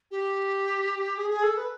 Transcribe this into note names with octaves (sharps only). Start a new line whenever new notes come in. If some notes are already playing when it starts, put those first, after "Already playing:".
G4
G#4
G#4
A4
B4